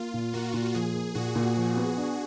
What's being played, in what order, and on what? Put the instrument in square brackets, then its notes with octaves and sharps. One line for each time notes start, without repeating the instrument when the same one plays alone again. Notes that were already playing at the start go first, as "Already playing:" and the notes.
Already playing: [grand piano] A#3 [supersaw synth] F4
[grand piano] A#2
[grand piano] A#3 [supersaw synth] F#4
[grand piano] A#2
[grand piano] F3 [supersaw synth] G#4
[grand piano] A#3
[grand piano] A#2 [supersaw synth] F#4
[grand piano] A#2
F3
B3
D4